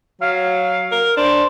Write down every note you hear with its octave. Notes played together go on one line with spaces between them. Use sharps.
F#3 F5
A#4
D4 C5